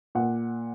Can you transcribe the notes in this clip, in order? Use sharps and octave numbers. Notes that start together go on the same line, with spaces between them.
A#2 F#5